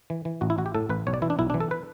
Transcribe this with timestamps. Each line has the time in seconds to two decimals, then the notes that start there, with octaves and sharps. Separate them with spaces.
0.10 E3
0.25 E3
0.41 A1 F#4
0.50 E4
0.58 A1 F#4
0.66 G4
0.75 A2 A4
0.89 A1 B4
1.07 B1 C#5
1.14 D5
1.22 E3 E4
1.30 D4
1.39 B1 E4
1.50 D4
1.54 E3
1.60 A4
1.71 B4